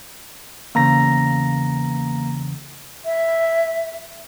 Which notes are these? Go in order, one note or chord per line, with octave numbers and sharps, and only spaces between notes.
E2 C#3 A#3 A#5 A#6
E5